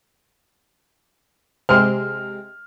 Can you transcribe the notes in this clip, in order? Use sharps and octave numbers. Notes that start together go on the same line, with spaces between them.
C3 G#3 C4 F6